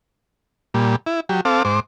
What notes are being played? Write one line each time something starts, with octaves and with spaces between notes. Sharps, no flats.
A#2 G3
E4
F#3 G4
C4 A4 F5 D6
G#2 C5 D6